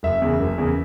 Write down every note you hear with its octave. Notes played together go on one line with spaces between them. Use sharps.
F#1 E5
E2 C#3
F#1
E2 C#3